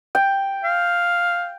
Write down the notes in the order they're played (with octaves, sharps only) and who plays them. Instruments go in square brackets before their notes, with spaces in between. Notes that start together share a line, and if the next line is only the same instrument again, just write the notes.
[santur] G5
[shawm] F5